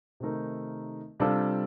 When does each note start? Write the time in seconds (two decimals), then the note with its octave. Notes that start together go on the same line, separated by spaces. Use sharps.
0.20 C3 D#3 A3 D#4 A#4
1.20 C3 G3 D4 F4 A4